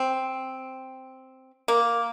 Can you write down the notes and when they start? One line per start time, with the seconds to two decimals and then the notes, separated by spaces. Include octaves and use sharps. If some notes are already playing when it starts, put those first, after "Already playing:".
Already playing: C4
1.68 A#3